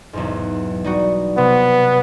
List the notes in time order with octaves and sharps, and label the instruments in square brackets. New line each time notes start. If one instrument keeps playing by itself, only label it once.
[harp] B1 E2 G#2
G3 D#4 F#4
[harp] C3 [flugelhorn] B3